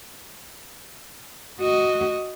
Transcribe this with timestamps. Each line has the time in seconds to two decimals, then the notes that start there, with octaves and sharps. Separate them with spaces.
1.60 F#4 D#5